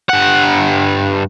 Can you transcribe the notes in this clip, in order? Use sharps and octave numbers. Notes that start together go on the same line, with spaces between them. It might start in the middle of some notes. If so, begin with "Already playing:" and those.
G2 F#5